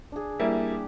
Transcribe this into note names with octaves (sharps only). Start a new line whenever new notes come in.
D4 G#4
G3 A#3 E4
G4